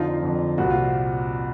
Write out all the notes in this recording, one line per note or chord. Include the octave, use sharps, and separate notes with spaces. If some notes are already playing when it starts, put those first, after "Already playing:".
Already playing: F2 D3 F3 D#4 F4
F2 D3 F3
C2 A#2 F3 F#4
F4